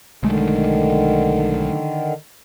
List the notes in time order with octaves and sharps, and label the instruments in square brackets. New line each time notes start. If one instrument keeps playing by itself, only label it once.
[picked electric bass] B1 G#3 A3 [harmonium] D3 D#3